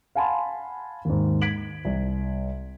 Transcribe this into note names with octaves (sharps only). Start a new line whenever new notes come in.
F5 F#5 G#5 A5 B5 C6
D#2 G#2
G#6 B6 D7 F#7
C2